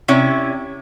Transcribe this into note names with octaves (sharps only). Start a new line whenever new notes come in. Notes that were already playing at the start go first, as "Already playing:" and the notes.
C3 C#4 E4 C#5